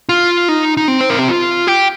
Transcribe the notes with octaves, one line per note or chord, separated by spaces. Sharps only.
F4
D#4
D#4
C4
C5
A#4
G4
F4
G4